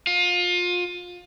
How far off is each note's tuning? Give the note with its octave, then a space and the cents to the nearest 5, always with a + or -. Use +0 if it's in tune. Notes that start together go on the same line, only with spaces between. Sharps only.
F4 +25